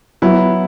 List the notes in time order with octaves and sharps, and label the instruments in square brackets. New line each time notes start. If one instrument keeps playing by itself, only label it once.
[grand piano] F#3 [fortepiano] B3 E4